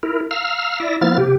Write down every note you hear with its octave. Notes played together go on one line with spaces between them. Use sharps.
E4 A#4
F5 A#5 E6 F6
E4 D5 E5 A#6
F3 A#3 B3 E4 F6 A6
C3 G4